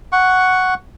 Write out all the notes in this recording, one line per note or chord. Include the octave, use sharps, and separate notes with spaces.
F#5 C#6